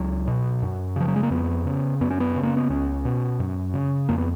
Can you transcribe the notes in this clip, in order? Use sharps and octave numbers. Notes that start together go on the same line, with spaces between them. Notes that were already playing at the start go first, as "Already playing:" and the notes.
Already playing: C#2 F#3
B2
F#2
C#3 F3
F#3
G#3
A#3
F2 B3
C#3
F#2 B3
C#4
B3
C#3
A#3
B3
C#2 C#4
B2
F#2
C#3
F2 A#3
B3